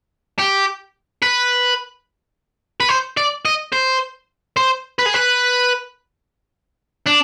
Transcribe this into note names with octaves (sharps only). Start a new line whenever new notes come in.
G4
B4
B4
C5
D5
D#5
C5
C5
B4
G#4
B4
D4